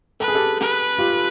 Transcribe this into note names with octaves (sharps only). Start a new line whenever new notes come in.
A4 B4
G#4
G4 A4
B4
F4 G4